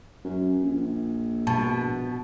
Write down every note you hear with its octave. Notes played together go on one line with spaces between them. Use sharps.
F#2
A#1
B2 A5